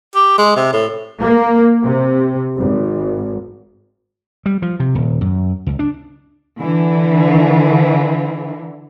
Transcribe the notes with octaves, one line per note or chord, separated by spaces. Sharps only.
G4
G#3
C3
A2
A#3
C3
G#1
G3
F3
C3
D#1
F#2
C#2
D4
D3 E3